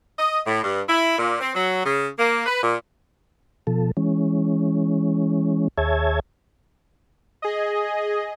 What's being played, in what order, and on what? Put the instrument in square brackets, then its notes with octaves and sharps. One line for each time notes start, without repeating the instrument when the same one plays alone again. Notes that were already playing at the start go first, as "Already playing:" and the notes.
[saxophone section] D#5
A2
G2
E4
A#2
C4
F#3
C#3
A#3
B4
A#2
[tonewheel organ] B2 F3 A4
E3 G#3 C#4
D#2 G#4 C#5 E5 A5 G#6
[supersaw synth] G#4 D#5